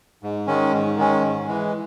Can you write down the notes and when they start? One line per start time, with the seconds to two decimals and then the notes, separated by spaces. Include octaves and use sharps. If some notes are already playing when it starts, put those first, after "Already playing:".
0.23 G#2
0.47 D#3 G#3 C#4
0.72 G#2
0.97 D#3 G#3 C#4
1.22 G#2
1.47 E3 G#3